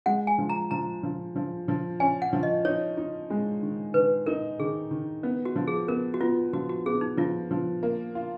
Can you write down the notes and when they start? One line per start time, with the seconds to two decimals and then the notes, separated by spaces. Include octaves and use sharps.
0.06 G#3 F#5
0.27 G#5
0.38 F3
0.49 A#5
0.71 F3 A#5
1.03 F3
1.36 F3
1.68 F3
2.00 C#4 G#5
2.22 F#5
2.33 F3
2.43 D#5
2.65 D#4 C#5
2.97 D#4
3.30 G#3
3.62 D#3
3.94 D#3 B4
4.26 D#4 A#4
4.60 D#3 G#4
4.91 D#3
5.23 B3
5.45 F#4
5.56 F3
5.68 G#4
5.88 B3 A#4
6.14 F#4
6.20 B3 F4
6.53 F3 F#4
6.69 F#4
6.86 B3 G#4
7.01 D#4
7.17 F3 F4
7.51 F3
7.83 A#3
8.15 F4